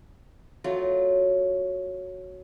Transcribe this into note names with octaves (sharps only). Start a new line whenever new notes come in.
F#3 A3 F4